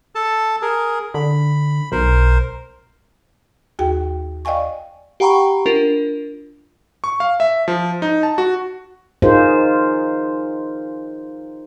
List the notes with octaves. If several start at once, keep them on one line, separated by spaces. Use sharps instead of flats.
A4 A5
G#4 A#4
D3 B5
B1 A#4 C5
D#2 F#4 G#4 G5
D5 D#5 F5 G5 G#5 C#6
G4 F#5 G5 A#5 B5 C#6
D4 F4 A#4
C#6
F5
E5
F3
D#4
A5
F#4
D#4 F4 G#4 A#4 C5